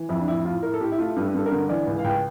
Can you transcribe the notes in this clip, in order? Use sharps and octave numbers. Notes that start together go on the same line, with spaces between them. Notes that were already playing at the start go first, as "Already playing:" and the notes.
Already playing: E3
F2 E4
D4
A2 E4
A2 F4
A2 A#4
A4
A2 G4
E4
A3 F4
G2
A4
G2 A4
A#4
D3
E3 D5
C#2
F5
C#2 G5